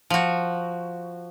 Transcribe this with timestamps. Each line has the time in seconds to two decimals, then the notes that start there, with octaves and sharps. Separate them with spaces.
0.10 F3 F#4